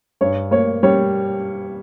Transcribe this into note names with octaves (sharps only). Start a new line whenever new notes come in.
G2 C#5
A#3 C#5
G3 C#5